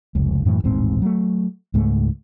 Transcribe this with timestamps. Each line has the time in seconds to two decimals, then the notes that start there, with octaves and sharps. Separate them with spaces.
0.15 F1 C#2
0.45 F#2 A2 E3
0.64 D#1 A1 G#2 C4
1.02 F#3 A3
1.74 C#2 G#2 G#3 A3